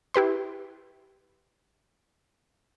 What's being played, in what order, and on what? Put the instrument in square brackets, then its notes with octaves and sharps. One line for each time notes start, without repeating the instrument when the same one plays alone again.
[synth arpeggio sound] E4 G4 B4 C6